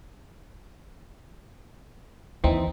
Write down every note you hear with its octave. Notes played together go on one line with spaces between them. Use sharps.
D#2 E3 C4 D#4